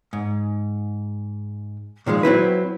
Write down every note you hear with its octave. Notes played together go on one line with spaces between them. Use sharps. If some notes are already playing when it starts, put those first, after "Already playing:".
G#2
A#2 D#3 F3 G#3
F#3 C4 E4 B4